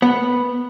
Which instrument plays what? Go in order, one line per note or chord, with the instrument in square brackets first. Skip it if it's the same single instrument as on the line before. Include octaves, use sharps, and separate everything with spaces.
[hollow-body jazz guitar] B3